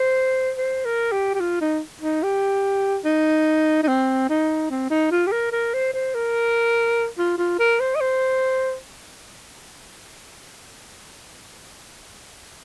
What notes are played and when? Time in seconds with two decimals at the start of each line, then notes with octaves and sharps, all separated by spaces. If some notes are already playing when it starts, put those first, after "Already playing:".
Already playing: C5
0.57 C5
0.85 A#4
1.12 G4
1.34 G4
1.40 F4
1.61 D#4
2.01 D#4
2.23 G4
3.04 D#4
3.83 D#4
3.88 C4
4.29 D#4
4.70 C4
4.90 D#4
5.11 F4
5.27 G4
5.32 A#4
5.52 A#4
5.74 C5
5.93 C5
6.14 A#4
7.18 F4
7.38 F4
7.59 A#4
7.80 C5
7.95 D#5
8.01 C5